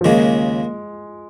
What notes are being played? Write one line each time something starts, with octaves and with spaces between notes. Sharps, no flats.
F3
D#2 C#3 G#3 A#3